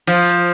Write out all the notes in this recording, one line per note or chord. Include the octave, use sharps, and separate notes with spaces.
F3